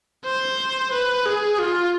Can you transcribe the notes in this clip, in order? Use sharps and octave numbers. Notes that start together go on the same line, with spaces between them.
C5
B4
G#4
F4